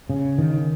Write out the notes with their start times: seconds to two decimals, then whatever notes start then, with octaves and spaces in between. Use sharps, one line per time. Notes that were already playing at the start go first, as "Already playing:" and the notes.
0.10 C#3
0.38 D#3